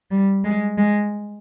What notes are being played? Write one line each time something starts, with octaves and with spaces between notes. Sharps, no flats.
G3
G#3
G#3